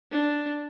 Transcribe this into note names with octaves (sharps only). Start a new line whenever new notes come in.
D4